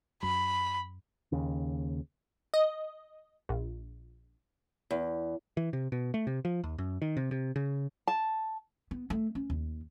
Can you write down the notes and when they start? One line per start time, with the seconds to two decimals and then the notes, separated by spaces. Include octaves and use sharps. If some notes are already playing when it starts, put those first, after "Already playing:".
0.23 F#2 F#3 B5
1.32 D#2 C#3
2.54 D#5
3.49 A#1
4.91 E2
5.57 E3
5.73 C3
5.92 B2
6.14 A3
6.27 C3
6.45 F3
6.64 D#2
6.78 F#2
7.02 D#3
7.17 C3
7.31 C3
7.56 C#3
8.07 A5
8.91 B3
9.10 A3
9.35 C#4
9.50 D#2